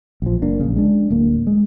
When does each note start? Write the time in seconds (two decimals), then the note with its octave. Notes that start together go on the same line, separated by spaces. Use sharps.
0.22 A#1 F3
0.42 F#1 A#3 D4
0.60 A#1 C#3
0.76 G#3 D4
1.10 D1 A#3
1.47 G#3